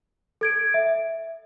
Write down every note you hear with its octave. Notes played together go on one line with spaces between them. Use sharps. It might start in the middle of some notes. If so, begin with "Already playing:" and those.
A4 G#6 D7
E5